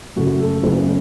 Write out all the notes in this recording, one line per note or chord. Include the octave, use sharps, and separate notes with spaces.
F#1 F#2 C#3 F#3 A3 F#4
A4
F#1 F#2 C#3 F#3 A3 B3 B4